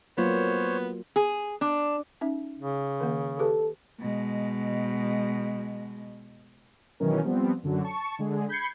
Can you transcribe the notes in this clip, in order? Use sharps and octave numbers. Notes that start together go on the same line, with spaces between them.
F#3 A#3 B3 F4 C5 C#5
G#4
D4
C#4 D#4 E5
C#3
D#3 A#3
G4 A4 B4
B2 G#3
B2 D#3 E3 F#3 C#4 A#4
F3 G3 B3 C4
F#2 D3 F#3
A5 C#6
D3 G#3 G#4
B5 G6 G#6 C7 C#7